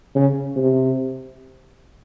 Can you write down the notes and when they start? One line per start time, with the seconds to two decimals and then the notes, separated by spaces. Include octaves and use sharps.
0.15 C#3
0.56 C3